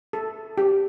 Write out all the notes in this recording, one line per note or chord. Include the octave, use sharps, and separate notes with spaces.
A4
G4